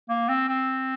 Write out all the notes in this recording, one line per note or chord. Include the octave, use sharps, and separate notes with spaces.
A#3
C4
C4